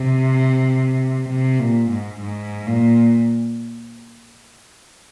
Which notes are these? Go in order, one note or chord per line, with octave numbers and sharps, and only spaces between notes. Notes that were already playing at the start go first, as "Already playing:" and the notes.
Already playing: C3
C3
A#2
G#2
G#2
A#2